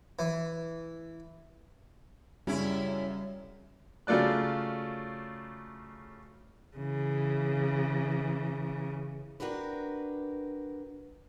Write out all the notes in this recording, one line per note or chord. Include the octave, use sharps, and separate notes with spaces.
E3
F#2 C#3 G3 C#4 E4
C#3 F#3 A3 F4 D5 F#6
C#3 E3
D4 F#4 G4 A#4 B4